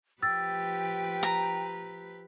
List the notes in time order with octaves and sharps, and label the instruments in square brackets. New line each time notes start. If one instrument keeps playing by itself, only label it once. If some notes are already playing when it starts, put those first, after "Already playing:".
[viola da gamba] F3 G4 B4 [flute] G5 [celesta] E6 A6
[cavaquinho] A#5